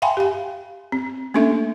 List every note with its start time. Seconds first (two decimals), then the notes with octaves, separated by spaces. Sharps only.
0.02 E5 F5 G5 G#5 B5 C6
0.17 G4 F5
0.92 C4
1.34 A3 A#3 C#4 D4 A4 E5